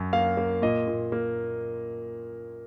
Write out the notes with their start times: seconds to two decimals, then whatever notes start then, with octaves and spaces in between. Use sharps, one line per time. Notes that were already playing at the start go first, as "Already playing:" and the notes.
Already playing: F#2 C#4
0.13 A#3 F5
0.37 A#3
0.62 A#2 D#5
0.88 A#2
1.12 A#3